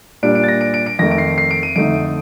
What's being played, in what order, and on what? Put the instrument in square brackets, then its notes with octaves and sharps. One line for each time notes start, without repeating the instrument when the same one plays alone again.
[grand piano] A#2 G3 D4 D7
D7
A6
A#6
D7
D7
D7
F2 D#3 A3 A#6
D7
C7
C7
D7
D#7
F2 D3 A3 D#4 D7